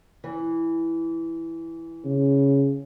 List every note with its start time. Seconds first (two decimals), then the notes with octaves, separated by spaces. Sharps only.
0.24 E3
2.05 C#3